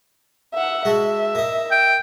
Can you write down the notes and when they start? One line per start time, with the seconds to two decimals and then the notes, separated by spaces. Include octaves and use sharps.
0.54 E5 F#5
0.85 G#3 F#4 E5 A5
1.35 A#3 D#5
1.71 G5